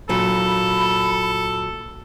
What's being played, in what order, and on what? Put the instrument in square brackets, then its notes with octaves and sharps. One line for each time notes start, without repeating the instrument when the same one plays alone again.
[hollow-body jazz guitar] A#2 F#3 [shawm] A4 [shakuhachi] B5